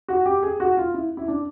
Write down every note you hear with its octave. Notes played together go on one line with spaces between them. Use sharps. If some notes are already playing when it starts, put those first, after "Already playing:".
F#4
G4
G#4
F#4
F4
E4
E4
D4